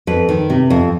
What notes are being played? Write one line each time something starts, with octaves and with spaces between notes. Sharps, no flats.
F2 B4
D#3
C3
F2